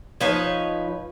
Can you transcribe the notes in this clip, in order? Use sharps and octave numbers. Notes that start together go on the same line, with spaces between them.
F3 D#4 B4 C#5